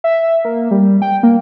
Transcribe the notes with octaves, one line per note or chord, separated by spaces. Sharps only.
E5
A#3
G3
G5
A#3